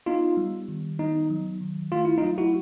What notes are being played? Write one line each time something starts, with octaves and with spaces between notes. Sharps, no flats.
B3 D#4 F4
G3
D#3
B3 D#4
F#3
D#3
A3 F4
E4
D#4 F4
F#3
E4 F#4